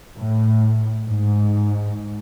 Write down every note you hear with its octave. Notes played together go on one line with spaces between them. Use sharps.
A2
G#2